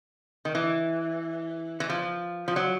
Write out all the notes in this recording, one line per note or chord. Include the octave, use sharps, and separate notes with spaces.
D#3
E3
E3
F3
F3
F#3